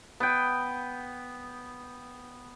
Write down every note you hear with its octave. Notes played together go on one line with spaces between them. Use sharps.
B3 G5